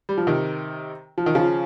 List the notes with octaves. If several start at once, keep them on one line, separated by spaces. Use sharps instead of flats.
G3
F3
C3 D#3
F3
D#3
C#3 F3